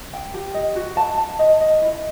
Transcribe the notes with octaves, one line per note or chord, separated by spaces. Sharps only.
G5
G4
D#5
F#4
A5
A5
D#5
D#5
E4